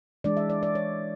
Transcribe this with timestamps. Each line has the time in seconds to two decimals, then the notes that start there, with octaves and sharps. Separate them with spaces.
0.24 E3 G#3 D4 D5
0.37 E5
0.50 D5
0.63 D5
0.75 C#5